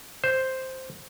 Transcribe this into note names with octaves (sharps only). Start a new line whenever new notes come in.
C5